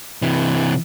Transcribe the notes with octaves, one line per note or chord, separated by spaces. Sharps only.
C3 E3